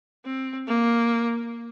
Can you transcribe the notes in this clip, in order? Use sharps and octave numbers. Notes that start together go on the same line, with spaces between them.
C4
A#3